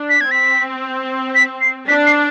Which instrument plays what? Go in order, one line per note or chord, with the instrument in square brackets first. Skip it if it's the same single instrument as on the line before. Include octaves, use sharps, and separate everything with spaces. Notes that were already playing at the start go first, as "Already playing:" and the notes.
Already playing: [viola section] D4
[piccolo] B6
G#6
[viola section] C4 [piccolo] B6
[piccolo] B6
C7
[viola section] D4 [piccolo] B6
[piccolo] C7